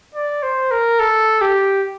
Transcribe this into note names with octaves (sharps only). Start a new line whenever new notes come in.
D5
C5
A#4
A4
G4